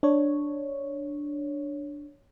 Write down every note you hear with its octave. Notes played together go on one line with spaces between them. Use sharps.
D4 C#5